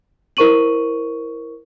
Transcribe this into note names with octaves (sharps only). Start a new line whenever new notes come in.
E4 A#4 C5 C#6 D#7 F#7